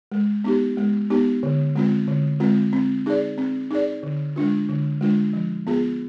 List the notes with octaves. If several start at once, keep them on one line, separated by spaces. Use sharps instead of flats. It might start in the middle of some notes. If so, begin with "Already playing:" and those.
G#3
B3 D#4 G4
G#3
B3 D#4 G4
D3
G#3 C4 F4
D3
G#3 C4 F4
C4
D#4 G#4 D5
C4
D#4 G#4 D5
D3
G#3 D4 F4
D3
G#3 D4 F4
F3
B3 F4 G#4